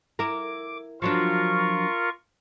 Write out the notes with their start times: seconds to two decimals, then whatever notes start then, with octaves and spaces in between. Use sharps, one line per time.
0.19 E4 A#4 D6
1.02 F3 F#3 D4 F4 A#4 C#6